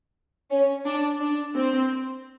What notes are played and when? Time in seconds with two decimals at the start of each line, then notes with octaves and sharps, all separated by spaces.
0.50 C#4
0.85 D4
1.20 D4
1.55 C4